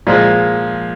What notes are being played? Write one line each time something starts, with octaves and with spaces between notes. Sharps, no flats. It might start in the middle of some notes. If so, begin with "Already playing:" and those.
A#2 F3 G#3